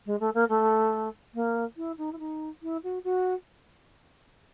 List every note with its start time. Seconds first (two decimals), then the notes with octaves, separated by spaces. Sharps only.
0.06 G#3
0.20 A3
0.34 A#3
0.49 A3
1.34 A#3
1.77 E4
1.98 D#4
2.12 E4
2.19 D#4
2.63 E4
2.84 F#4
3.04 F#4